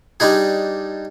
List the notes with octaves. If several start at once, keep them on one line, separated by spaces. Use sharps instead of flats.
G3 D4 D#4 G#4